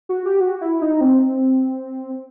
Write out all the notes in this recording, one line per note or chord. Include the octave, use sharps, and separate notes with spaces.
F#4
G4
F#4
E4
D#4
C4